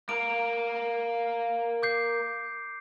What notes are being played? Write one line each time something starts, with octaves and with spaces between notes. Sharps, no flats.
A#3 A#4 D7
D6 G6 C7